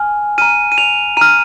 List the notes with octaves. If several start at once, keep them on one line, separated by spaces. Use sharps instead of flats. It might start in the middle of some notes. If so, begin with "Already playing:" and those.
Already playing: G#5 F6
A#5 F6 D#7
D#7
F7
A#5 F6 D#7